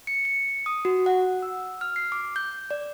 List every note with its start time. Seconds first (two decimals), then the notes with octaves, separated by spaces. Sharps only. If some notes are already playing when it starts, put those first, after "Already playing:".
0.07 C#7
0.25 C#7
0.66 D#6
0.85 F#4
1.06 F#5
1.42 E6
1.81 F6
1.96 C7
2.12 D6
2.36 G6
2.71 D5